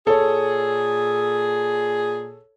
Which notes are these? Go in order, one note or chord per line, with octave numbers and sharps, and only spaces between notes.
A#2 G#4 A4 C#5